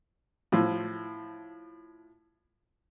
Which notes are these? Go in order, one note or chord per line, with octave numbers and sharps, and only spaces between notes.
A2 F3